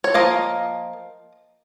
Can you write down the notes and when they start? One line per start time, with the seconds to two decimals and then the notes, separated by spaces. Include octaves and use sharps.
0.04 C#5
0.14 F3 A#3 F4 D#5